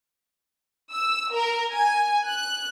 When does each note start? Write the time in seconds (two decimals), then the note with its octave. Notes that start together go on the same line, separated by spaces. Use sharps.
0.92 E6
1.34 A#4
1.73 G#5
2.27 F#6